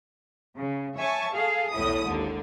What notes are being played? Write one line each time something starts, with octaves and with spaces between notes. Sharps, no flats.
C#3
C#5 E5 G#5 A5 C#6
G#4 A4 F5
B1 E2 A2 E4 D#6
G#1 D#2 D3